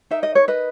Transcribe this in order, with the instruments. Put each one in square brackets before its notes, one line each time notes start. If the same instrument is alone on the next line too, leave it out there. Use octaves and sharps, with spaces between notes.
[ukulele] D#4 A#4 E5
D#5
C#5
B4 D#5